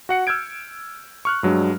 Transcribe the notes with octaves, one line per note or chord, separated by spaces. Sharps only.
F#4 F#5 C#7
E6 F6 G6 G#6 D7
C#6 F6 F#6
G2 F#3 G#3 D4